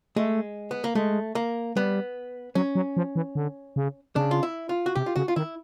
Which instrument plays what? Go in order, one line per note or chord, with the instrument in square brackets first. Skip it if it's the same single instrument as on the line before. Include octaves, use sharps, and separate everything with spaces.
[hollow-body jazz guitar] G#3 [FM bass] A3
[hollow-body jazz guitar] B3
A#3
[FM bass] G#3 [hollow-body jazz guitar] A3
[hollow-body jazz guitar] A#3
[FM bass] G3 [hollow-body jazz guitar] B3
[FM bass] F#3 [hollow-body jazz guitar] C#4
[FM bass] F#3
F3
E3
D3
C#3
[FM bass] C#3 [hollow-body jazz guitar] D4
[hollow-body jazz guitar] F4
E4
F4
F#4
[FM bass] C3 [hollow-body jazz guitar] G4
[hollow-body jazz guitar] F4
[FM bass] C#3 [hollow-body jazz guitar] F#4
[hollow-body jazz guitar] F4
[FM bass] D#3 [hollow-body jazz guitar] E4